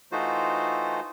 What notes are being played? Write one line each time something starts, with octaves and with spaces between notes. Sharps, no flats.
E3 A3 D#4 F4 F#4 C5